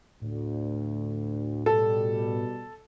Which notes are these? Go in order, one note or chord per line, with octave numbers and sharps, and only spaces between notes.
D2 A2
B2 G3 A4